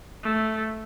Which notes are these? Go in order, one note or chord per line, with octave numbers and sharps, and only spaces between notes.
A3